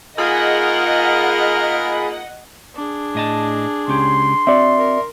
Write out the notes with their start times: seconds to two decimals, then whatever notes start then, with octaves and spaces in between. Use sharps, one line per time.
0.18 A#3 D#4 F4 G#4 A#4 D#5 F#5 B5
2.75 D4 G#4
3.15 A2 D#5 A5
3.88 C#2 C#4 G4 C6
4.47 C4 F#4 D5 E5
4.78 A#4